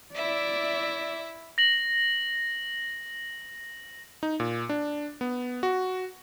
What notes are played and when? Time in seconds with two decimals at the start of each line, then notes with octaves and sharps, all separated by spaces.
0.15 E4 D5 E5
1.58 A#6 F#7
4.23 D#4
4.40 A#2
4.69 D4
5.21 B3
5.63 F#4